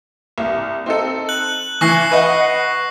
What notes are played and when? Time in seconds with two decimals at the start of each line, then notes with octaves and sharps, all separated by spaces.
0.38 C2 A#3
0.86 C4 D#4 A4
1.29 F#6 F#7
1.81 E3 C#6 A#6 C7
2.11 B4 D#5 F#5